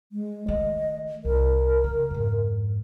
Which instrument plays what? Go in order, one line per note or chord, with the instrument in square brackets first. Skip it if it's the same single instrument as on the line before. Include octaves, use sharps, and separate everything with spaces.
[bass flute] G#3
[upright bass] D#3 A3 [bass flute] D#5
[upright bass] C2 [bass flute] A#4
[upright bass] C#3
F2 G#2